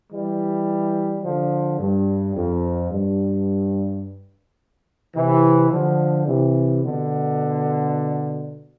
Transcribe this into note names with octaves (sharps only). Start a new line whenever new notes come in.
E3 G3
D3 F3
G2
F2
G2
C3 E3
D3 F3
C3 E3
B2 D3